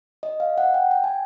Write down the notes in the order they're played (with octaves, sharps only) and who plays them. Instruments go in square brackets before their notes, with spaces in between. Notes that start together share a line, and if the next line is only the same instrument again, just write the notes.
[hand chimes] D#5
F5
F#5
G5
G5
G#5